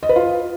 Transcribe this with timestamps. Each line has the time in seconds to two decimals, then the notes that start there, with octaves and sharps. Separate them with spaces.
0.03 D#5
0.09 B4
0.16 F4